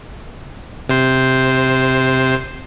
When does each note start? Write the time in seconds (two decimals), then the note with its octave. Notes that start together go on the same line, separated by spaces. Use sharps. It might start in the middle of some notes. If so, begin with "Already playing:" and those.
0.89 C3 C5